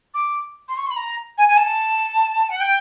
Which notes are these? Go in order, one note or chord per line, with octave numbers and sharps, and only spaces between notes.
D6
C6
C#6
C6
B5
A#5
G#5
G#5
A5
F#5
G5